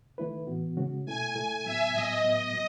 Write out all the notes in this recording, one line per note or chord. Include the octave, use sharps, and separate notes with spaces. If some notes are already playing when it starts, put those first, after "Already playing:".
D#3 A3 E4 B4
A2 E3 B3 F#4
C#3 G#3 C#4 F#4
B2 A3 E4 A4 G#5
A3 E4 A4 G#5
A2 F#3 B3 E5
A2 F#3 B3 D#5
A2 F#3 B3 D#5
F#3 F#4